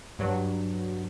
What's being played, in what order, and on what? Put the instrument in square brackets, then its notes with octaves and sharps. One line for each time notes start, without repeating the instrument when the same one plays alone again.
[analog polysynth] G2 F#3